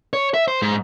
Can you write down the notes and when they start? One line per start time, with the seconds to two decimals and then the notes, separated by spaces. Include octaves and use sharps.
0.13 C#5
0.34 E5
0.48 C5
0.62 G#2